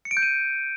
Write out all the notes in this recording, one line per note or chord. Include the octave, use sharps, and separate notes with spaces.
C#7
D7
G6
D#7